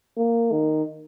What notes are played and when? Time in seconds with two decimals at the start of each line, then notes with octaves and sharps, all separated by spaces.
0.18 A#3
0.52 D#3